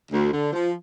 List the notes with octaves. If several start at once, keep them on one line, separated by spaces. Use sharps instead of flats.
D2
D3
F3